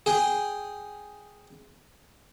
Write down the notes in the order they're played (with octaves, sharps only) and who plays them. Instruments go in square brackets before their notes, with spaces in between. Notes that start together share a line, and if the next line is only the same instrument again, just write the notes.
[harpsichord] G#4 G5